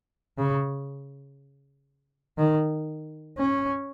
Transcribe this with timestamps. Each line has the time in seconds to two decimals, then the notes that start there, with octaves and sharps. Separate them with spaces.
0.38 C#3
2.38 D#3
3.38 C#4